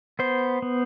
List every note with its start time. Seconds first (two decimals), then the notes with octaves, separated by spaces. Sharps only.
0.19 B3 C5
0.62 B3